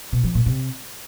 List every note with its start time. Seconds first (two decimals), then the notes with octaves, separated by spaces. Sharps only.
0.12 B2
0.24 F3
0.35 A#2
0.46 C3